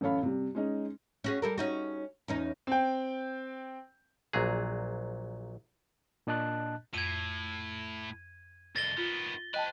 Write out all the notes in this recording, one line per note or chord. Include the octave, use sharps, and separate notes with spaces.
A1 F#2 A4 C#5 F5 B5
C3 G3
G#3 C#4 D#4
C#4 F#4 G#4
G3 A4 A#4
C#4 D#4 F#4
E2 C#4 D#4
C4 G5
A#1 A#2 F#3 G#4
A#2 D4 D#5 A5 F#6
F2 A2 G#6 D#7
C2 F2 A6 A#6 G7
D#3 B3 F4
C5 D#5 G5 A5 B5 F#6